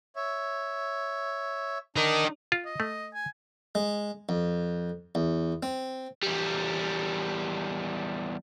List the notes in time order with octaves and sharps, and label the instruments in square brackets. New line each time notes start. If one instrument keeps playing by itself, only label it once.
[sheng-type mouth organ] C#5 E5
[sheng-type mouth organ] D4 D#6 [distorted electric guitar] D#4 A#4
[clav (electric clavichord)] F4
[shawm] D#5
[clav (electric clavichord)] A3
[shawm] G#5
[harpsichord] G#3
F2
E2
C4
[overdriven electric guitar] E2 G3